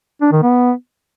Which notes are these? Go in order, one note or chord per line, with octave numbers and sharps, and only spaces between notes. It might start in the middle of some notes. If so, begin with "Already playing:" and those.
D4
D#3
B3